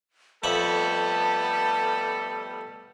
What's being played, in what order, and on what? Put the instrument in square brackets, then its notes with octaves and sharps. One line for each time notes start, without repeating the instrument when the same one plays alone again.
[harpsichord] F2 E5 F#5 [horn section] G3 A3 B3 [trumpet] A4 [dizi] A5